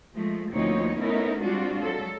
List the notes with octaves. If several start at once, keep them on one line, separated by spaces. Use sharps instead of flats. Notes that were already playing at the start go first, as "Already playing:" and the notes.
F3 G#3 A3
D2 F3 A#3 C4 D#4 C#5
A3 B3 C#4 D#4 E4 A#4
G3 G#3 C4 D4 F4 F#4
F#3 G#3 A4